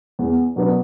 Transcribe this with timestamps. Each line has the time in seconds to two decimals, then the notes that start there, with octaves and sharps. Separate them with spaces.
0.19 E2
0.56 B2 F#3 B3 D4